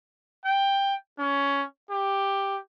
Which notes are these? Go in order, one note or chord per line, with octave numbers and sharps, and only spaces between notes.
G5
C#4
G4